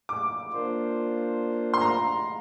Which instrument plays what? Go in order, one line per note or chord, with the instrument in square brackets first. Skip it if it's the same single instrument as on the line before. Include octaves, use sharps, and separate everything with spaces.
[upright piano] D6
[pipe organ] A#3 D4 F4 C5
[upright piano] C6
A#5